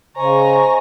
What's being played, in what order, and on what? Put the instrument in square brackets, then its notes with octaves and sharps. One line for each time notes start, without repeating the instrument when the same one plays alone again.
[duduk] C#3 [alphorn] C5 [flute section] D#5 G#5 C#6 [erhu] A#5